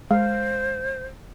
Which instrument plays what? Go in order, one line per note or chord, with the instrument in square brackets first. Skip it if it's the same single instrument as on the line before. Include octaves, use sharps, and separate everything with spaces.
[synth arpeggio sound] G#3 [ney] C5 [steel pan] F5